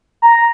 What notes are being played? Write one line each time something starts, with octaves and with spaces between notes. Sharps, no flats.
A#5